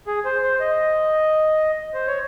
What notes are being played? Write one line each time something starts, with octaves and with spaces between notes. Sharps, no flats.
G#4
C5
C5
D#5
C5
C#5